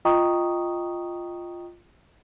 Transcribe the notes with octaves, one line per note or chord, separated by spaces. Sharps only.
F4 D#5 G5 A#5 C#6 D#6